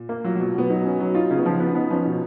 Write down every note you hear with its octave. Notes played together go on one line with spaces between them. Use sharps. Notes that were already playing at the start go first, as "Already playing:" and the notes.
Already playing: A#2
A#3
F#3 F4
F#3
B2
B2 B3
F#3 D#4
C#4
F#3
D#4 F4
C#3
B3
F3
B3 C#4
B3 D#4
F3 C#4
B2 D#4